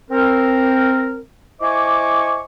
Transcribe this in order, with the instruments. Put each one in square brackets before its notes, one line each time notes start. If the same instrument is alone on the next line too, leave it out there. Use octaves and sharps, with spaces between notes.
[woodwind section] C4 A#4
E4 C5 D#5 G#5 C#6 D6